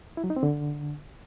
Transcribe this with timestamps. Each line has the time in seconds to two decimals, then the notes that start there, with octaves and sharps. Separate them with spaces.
0.17 E4
0.24 F#3
0.30 D#4
0.36 C4
0.43 D3